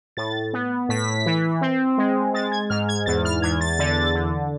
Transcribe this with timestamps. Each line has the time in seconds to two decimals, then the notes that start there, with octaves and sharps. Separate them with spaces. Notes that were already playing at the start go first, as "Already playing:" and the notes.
0.17 A2 A6
0.53 B3
0.89 A2 B6
1.26 E3
1.61 C4
1.98 G#3
2.34 G#3 A6
2.52 G#6
2.70 G#2 F6
2.89 G#6
3.06 E2 A6
3.25 F6
3.42 E2 G#6
3.61 A6
3.79 D3
4.15 D3